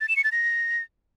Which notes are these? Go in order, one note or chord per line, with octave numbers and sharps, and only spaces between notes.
A6
E7
C#7
A6
A#6